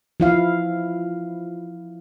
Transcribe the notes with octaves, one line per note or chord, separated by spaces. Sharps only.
F3 E4 F5